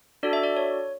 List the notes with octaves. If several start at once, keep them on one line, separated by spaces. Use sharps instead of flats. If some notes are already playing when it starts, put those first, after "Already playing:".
D4 F#4 A4 D5
E5
D5
C#5